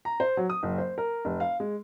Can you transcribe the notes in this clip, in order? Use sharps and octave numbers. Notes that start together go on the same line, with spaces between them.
A#5
C5
F#3
D#6
F#1
C5
A#4
F1
F5
G#3